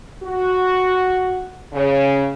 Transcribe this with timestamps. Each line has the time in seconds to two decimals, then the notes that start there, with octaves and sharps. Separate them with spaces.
0.24 F#4
1.73 C#3